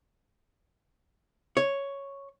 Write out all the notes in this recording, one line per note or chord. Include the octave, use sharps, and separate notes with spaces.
C#5